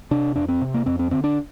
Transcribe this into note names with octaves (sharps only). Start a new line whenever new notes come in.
C3 D4
F2 D4
C4
C3
A#3
F2 C4
C4
D3 C4
D4